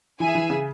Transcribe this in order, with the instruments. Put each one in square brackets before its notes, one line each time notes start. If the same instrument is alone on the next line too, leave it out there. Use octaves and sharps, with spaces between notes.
[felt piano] E3 [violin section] G#4 E5 G#5
[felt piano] E3
C#3